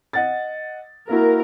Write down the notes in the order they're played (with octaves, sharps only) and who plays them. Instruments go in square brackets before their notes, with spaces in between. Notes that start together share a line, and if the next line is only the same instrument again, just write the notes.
[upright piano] D#5 F#5 A6
[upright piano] A#3 E4 F#4 [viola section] A#4